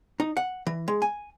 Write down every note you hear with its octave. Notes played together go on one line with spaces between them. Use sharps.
D#4
F#5
E3
G#3
G#5